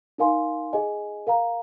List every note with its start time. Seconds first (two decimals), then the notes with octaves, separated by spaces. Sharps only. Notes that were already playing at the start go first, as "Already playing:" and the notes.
0.18 D#4 A#4 F5 G#5 C6
0.73 G#4 D#5 G#5
1.27 A#4 F5 A#5